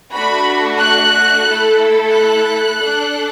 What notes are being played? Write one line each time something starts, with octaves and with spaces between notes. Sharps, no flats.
A3 D4 F#4 B5
F#6
A3 E4 A4
F#6
D4 A4